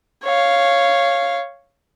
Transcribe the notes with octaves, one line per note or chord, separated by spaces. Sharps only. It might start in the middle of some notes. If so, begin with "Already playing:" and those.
C#5 F5